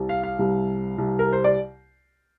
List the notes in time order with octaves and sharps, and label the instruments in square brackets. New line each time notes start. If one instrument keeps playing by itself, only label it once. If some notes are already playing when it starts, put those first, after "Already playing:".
Already playing: [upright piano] C2 C3 G3
F5
F5
C2 C3 G3
C2 C3 G3
A#4
C5
D5